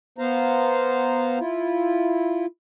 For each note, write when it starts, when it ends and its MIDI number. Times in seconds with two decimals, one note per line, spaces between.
0.18 1.39 59
0.18 1.39 72
0.18 1.39 77
0.18 1.39 82
1.39 2.46 64
1.39 2.46 65